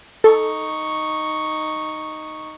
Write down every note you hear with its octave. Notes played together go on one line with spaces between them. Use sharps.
D#4 A4 C#6